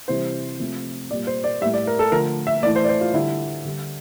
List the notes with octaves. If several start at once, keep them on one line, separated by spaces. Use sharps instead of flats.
C3 E3 G3 C5
C3 F3 A3
A#2 G3 D5
C5
D5
A2 G3 E5
D5
A#4
A4
D3 F3 A3 A#4
E5
A2 E3 A3 D5
C5
D5
C5
F4
D3 G3 E4
D3 G3